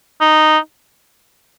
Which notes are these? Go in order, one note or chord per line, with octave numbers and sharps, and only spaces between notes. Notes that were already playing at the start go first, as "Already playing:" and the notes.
D#4